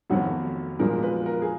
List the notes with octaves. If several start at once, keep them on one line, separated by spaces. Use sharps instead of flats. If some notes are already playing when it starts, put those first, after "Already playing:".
F1 F2 D#3 F#3 B3 F#4
B1 A#2 F3 G#3 A#4
B4
A#4
G#4